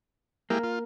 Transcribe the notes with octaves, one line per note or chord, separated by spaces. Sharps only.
G#3 A#3 E4 G4
F4